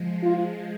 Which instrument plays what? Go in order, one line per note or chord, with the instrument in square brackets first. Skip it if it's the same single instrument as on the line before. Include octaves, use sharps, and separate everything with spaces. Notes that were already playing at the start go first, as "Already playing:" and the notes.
Already playing: [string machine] F3 G#3
[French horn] F4